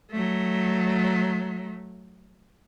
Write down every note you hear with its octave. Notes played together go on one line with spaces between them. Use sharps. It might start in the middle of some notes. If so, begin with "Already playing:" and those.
F#3 A3